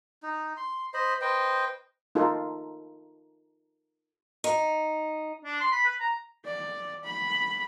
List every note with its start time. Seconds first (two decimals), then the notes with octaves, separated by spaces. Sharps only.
0.23 D#4
0.57 C6
0.94 C5 D#5 B5
1.21 B4 C5 D#5 G5
2.15 D#4 F4 A4 A#4
4.44 D#4
5.45 D4
5.60 C6
5.72 B5
5.85 B4
6.00 A#5
6.45 D5
7.04 B5